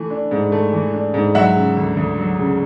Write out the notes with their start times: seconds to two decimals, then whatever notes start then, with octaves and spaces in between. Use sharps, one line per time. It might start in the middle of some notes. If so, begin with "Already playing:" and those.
Already playing: E3 A3
0.10 D4
0.31 G#2
0.52 A3
0.73 E3
0.93 D4
1.14 G#2
1.35 F#3 E5 F#5
1.56 C#3
1.77 D2
1.97 D2
2.18 F#3
2.39 C#3